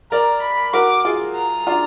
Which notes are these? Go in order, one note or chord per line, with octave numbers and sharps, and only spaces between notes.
A#4 D5 A#5
B5
F#4 A#4 D6
F4 G#4
A#5
D4 F4